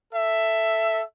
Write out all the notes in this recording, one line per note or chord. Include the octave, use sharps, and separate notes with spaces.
A4 E5